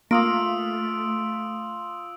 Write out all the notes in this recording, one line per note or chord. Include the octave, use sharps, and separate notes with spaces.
A3 A#3 F4 D#6 E6 D7